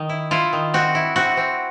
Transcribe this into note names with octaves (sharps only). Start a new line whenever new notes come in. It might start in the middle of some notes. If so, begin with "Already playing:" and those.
Already playing: D#3
E4
E4 F4
D#3
C4 F#4
E4
C4 F#4
C4